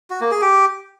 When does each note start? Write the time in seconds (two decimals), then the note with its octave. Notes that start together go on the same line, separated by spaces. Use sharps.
0.10 F#4
0.21 A#3
0.31 G#4
0.42 G4